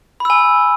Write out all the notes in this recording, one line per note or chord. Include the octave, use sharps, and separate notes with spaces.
G#5 B5 E6